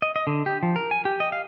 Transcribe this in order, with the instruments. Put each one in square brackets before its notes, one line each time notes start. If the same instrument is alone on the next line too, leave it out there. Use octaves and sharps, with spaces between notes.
[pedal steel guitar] D#5
D#5
D3
G4
F3
A#4
G#5
G4
D#5
F5